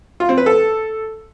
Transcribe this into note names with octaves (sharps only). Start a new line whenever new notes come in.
F4
C4
B4
A4